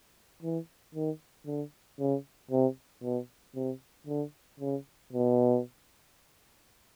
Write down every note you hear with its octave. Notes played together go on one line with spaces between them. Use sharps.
E3
D#3
D3
C#3
C3
B2
C3
D3
C#3
B2